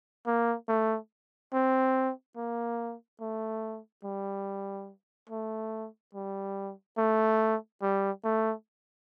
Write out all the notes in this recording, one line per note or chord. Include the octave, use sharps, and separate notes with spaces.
A#3
A3
C4
A#3
A3
G3
A3
G3
A3
G3
A3